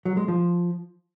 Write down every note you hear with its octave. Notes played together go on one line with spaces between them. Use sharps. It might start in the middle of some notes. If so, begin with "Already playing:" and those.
F#3
G#3
F3